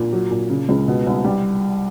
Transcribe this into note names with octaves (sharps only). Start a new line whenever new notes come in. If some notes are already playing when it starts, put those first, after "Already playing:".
Already playing: A#2
F#3
A#2
C#3
C#2
B2
C2
G3